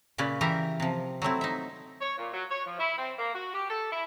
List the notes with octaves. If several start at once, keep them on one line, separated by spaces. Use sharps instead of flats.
A#2 C#3 C#4 B4 D5
E3 G4 A#4 E5
C3 F3
F#3 A3 C4 E4
D#4 E5
C#5
A#2
F#3
C#5
F3
E4
C4
A#3
F#4
G4
A4
E4